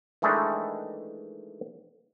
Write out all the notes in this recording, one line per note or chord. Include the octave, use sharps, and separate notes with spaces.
D#3 E3 G#3 A3 D4 D#4